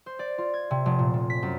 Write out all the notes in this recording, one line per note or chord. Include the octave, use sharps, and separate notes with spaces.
C5
D5
F4
G#6
C3
F1
A#2
F3
B6
F#2